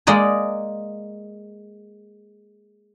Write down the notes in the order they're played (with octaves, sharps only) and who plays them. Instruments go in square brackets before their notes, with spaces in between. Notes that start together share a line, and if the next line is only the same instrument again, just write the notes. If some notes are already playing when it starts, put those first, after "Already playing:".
[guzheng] G#3 A#3 D5 D#5 A#5